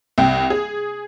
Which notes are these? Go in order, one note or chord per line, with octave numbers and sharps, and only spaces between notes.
C2 G5
G#4